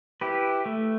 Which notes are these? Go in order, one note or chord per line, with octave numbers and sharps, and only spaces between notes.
E4 G4 B4
A3